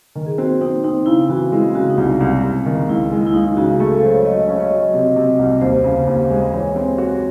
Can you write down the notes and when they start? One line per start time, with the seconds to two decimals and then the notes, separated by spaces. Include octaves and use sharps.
0.15 D#3
0.26 G#4
0.38 C4 F#4
0.61 C4 D#4
0.84 C4 D#4
1.06 C#3 E4
1.29 E3 F#4
1.52 G#3 E4
1.75 C#3 F#4
1.90 D#4
1.97 C2 E4
2.20 C2
2.43 C2
2.66 D#3
2.89 C#2 E4
3.11 G#3 E4
3.27 E4
3.34 C#2 D#4
3.57 C#3 F#4
3.79 A3 G#4
3.91 A4
4.02 F#3 C5
4.14 C#5
4.26 F#3 D#5
4.40 C#5
4.47 C#4
4.56 D#5
4.63 C#5
4.70 F#3 D#5
4.94 C3
5.16 C3
5.39 C2
5.61 D#2 C5
5.84 C#3
6.07 D#2
6.30 G#3
6.53 E3 C#5
6.76 C4
6.98 F#4